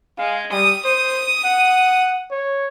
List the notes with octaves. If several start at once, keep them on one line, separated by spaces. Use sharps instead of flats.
G#3 F5
G3 D#6
C5 D#6
F#5
C#5